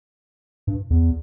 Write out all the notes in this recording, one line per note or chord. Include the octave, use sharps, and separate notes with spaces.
G2
E2